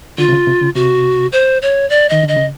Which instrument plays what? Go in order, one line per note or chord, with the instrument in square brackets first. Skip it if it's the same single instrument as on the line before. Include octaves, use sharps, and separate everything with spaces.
[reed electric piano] D3 [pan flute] F4
[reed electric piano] C3
C#3
C3
C#3
[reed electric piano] C3 [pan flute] F#4
[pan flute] C5
C#5
D5
[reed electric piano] D#3 [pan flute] D#5
[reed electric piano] D3 [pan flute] D#5
[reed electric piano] C#3